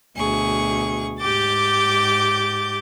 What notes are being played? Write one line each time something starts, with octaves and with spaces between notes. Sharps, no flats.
D2 B2 G#4 C#6
G#2 G4 D6 G6 A6